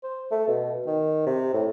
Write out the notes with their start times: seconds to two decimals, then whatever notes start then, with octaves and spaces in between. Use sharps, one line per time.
0.03 C5
0.31 A3
0.48 B2
0.86 D#3
1.27 C3
1.54 A2